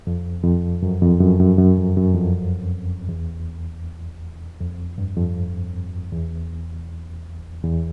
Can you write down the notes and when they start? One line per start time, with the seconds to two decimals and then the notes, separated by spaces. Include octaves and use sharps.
0.07 F2
0.44 F2
0.82 F#2
1.02 F2
1.20 F#2
1.40 F#2
1.58 F#2
1.77 F2
1.97 F#2
2.15 F2
3.09 E2
4.61 F2
4.98 G2
5.17 F2
6.12 E2
7.64 E2